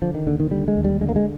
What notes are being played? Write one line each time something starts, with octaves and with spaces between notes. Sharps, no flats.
D3 F3
D#3
D#2 D3
D#3
D3 G3
G#3
D#2
G3
D3 G#3
A#3
G#3